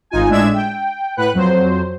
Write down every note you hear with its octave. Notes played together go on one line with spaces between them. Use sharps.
G#1 D#4 F4 G#5
A2 G#3 D4 E5 G#6 E7
G5
A2 B4 F#5 F#6
F2 F#3 C5